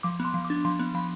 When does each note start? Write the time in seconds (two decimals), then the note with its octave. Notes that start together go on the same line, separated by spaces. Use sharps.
0.03 F3 D6
0.20 B3
0.25 C6
0.34 F3
0.45 D6
0.50 D4
0.65 F3 C6
0.79 B3
0.95 F3 B5